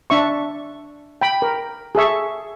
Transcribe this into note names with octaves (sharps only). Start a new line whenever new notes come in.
D4 E5 C#6
G5 B5
A#4
G#4 A4 E5 C#6